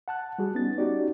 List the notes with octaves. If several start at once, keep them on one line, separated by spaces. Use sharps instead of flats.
F#5 A5 F#6
G3 F#4 G#4
B3 C#4 D#4 A6
C#4 D#4 F#4 G4 D5